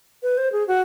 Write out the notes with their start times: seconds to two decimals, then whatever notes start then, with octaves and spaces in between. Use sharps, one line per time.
0.23 B4
0.38 C5
0.52 G#4
0.68 F#4